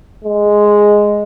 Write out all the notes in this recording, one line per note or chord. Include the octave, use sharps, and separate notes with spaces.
G#3